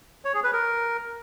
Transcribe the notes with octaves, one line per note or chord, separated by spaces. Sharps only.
C#5
G#4
B4
A#4